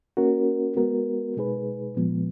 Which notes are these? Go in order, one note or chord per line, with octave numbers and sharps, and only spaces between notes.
A#3 C#4 F#4 A#4
G#3 B3 F#4 A#4
B2 G#3 D#4 G#4 B4
A#2 F3 G#3 B3